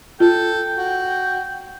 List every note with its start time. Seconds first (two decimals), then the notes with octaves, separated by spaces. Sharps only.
0.20 F4 A4 G5
0.77 F#4